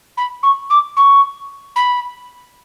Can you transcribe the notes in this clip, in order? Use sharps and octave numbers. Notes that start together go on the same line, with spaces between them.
B5
C#6
D6
C#6
B5